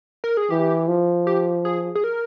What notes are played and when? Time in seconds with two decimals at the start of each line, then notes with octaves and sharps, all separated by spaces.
0.24 A#4
0.37 G#4
0.50 E3 G4
0.88 F3
1.27 G4
1.65 G#4
1.95 G#4
2.04 A#4